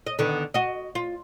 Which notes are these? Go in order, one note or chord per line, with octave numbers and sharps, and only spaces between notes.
D#5
D3 D#3 B3
F#4 D#5
F4